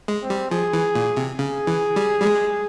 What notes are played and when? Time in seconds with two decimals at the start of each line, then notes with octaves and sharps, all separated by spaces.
0.08 G#3
0.23 C4
0.30 G3
0.51 F3 G#4
0.73 E3
0.95 A#2
1.17 C3
1.39 C#3 G#4
1.67 E3
1.96 G3
2.21 G3
2.25 G#3